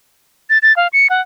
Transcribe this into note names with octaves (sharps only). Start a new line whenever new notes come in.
A6
A6
F5
C#7
F#5